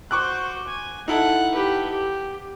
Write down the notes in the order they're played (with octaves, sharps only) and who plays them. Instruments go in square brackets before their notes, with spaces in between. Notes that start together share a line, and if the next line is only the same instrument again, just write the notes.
[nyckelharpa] F#4 C5 [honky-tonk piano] C#6 D6 F#6
[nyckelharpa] G#5
[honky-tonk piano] D#4 E4 A4 [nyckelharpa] F#5
[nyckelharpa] G4 B4
G4